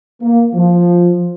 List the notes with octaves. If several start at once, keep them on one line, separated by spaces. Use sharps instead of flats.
A#3
F3